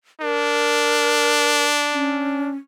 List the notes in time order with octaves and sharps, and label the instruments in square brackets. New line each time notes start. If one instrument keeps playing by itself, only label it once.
[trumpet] D4 [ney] A#4
[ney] C#4